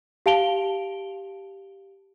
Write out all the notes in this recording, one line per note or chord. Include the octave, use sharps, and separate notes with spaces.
G4 F5 A5 D7 F7 G7